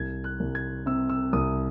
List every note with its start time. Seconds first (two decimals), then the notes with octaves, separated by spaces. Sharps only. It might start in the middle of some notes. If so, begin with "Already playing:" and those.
Already playing: C2 G#6
0.24 F#6
0.40 C2
0.55 G#6
0.86 C3 E6
1.09 E6
1.33 C2 D#6